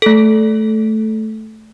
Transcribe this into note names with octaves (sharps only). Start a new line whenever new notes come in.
A3 A4